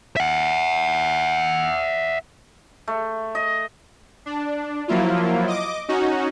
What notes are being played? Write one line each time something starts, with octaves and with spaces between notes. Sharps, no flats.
E5 F#5
A3
D#5
D4
F3 F#3 A#3 E4 F4
D#5 D6
C#4 D#4 F#4